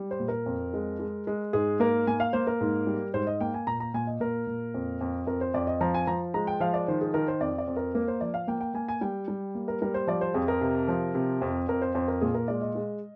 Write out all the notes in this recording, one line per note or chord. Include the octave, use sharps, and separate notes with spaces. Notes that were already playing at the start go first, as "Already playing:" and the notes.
Already playing: G3
C5
A#2
A#4
F2
G#3
G#3
G#3
G#2 G#4
A#3 A#4
A#3 G#5
F5
A#3 C5
A#4
G#2
G3
G#2 C5
D#5
A#3 G5
G#5
A#2 A#5
A#5
A#2 G#5
D#5
A#2 A#4
A#2
F2
F2
F2 A#4
C5
F2 D5
D#5
F3 A#5
G#5
F3 A#5
G#3 A#5
G5
F3 F5
D5
D#3 C5
G#4
D#3 A#4
C5
F2 D5
D5
F2
A#4
A#3 A#4
C5
F3 D5
F5
A#3 G5
G5
A#3 G#5
G#5
G3 G5
G3
A#3
A#4
G3 A#4
C5
F3 D5
C5
F2 G#4
A#4
C3
F3
C3
F2
F2 A#4
C5
F2 C5
A#4
A#2 G#4
A#4
G#3 D5
D#5
G#3